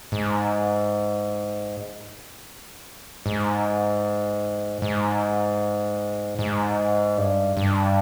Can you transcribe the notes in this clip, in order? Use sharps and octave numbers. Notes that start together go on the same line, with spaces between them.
G#2
G#2
G#2
G#2
G2
G2